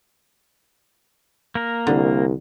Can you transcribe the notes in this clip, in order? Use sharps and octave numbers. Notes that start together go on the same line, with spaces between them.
A#3 A#4
C2 D3